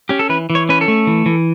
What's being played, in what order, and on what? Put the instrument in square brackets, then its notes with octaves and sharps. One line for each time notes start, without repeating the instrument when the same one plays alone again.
[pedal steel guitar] C#4 G4
A4
E3 B4
E3
C#5
C#4 B4
A4
A3
E3
E3